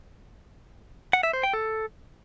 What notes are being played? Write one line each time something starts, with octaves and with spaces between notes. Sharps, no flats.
F#5
E5
C5
G5
A4